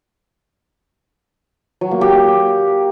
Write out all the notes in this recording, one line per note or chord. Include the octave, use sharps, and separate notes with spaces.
F#3
A#3
G4